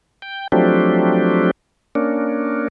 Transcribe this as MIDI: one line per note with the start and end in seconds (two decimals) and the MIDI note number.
0.22 0.48 79
0.52 1.51 53
0.52 1.51 54
0.52 1.51 57
0.52 1.51 60
0.52 1.51 62
0.52 1.51 67
1.95 2.68 58
1.95 2.68 61
1.95 2.68 62